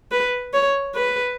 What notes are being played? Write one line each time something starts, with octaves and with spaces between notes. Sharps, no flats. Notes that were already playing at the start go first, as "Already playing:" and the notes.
B4
C#5
B4